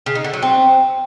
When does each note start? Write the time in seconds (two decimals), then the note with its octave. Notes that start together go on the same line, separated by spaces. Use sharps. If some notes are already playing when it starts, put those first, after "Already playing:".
0.06 C#3
0.15 D#4
0.24 D3
0.33 F#3
0.42 C4